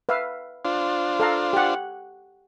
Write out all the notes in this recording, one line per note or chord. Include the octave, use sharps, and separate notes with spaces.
B4 E5 F5
D4 F4 C5
A4 F5 A#5
G4 F#5